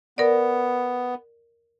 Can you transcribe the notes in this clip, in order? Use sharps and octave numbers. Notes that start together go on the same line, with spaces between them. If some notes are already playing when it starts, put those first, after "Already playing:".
B3 A#4 D5